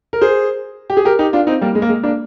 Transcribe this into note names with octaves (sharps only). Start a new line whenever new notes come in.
A#4
G#4 C5
G4
G#4
G4 A#4
D#4 G4
D4 F4
C4 D#4
G3 A#3
G#3
A#3
G#3
A#3 D4